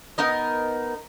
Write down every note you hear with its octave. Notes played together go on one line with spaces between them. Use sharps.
B3 D#4 A#4 D#5